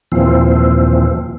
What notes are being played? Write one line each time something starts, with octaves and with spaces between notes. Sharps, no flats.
D#2 A#2 E3 F3 C4